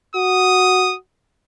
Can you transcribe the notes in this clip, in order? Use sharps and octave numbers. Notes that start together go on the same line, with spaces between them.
F#4 D#6